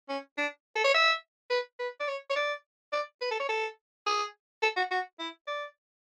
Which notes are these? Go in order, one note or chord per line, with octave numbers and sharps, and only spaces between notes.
C#4
D4
A4
C#5
E5
B4
B4
D5
C#5
C#5
D5
D5
B4
A4
C#5
A4
G#4
A4
F#4
F#4
E4
D5